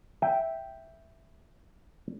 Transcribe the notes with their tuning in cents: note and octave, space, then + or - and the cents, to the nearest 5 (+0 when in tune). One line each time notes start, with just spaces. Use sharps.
E5 +0 G5 +0